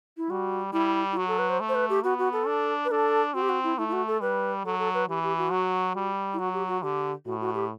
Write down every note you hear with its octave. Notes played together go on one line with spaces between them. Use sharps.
E4
G3 F#4
G3 E4
E4
F#3 F#4
A4
B4
C5
A3
C5
B4
G4
B3 F#4
F#4
A4
D4
B4
D4 A4
C4 F#4
G4
F#4
E4
A3 E4
E4
F#4
A4
G3 B4
F#3 A4
A4
B4
E3 G4
G4
F#4
F#3
G3
E4
F#3 F#4
G4
F#4
D3 G4
A2 F#4
F#4
G4